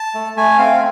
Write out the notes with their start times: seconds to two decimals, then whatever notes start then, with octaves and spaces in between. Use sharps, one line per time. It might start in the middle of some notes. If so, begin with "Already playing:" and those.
Already playing: A5
0.15 A3
0.37 A3 G#5
0.58 C4 F5